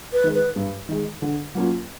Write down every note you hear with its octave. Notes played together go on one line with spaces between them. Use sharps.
B4
D#3 G#3
B4
G2
D#3 G#3
D3
F#3 A#3 C#4 F4